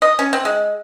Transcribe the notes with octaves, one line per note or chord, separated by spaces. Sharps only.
D#5
C#4
C4
G#3